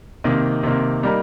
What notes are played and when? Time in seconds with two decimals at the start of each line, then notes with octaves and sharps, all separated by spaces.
0.24 C3 D#3 A#3
0.63 C3 D#3 A#3
1.03 G3 A#3 D#4 A#4